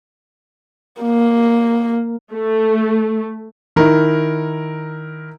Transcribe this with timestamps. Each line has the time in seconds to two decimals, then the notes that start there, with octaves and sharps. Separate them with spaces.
1.02 A#3
2.32 A3
3.76 D#3 E4 A#4